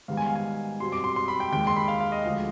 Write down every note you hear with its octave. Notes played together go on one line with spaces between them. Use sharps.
G#2 D#3 G3 B3 F5
G#5
F5
G#5
B2 G3 C4 C6
D6
C6
C6
B5
G5
D#2 D#3 G#3 G5
C6
B5
F5
F5
D#5
D2 D3 F3 G#3 F5